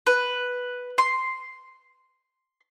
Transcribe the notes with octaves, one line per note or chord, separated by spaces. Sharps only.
B4
C6